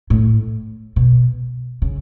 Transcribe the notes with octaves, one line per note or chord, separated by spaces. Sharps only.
A2
B2
C#3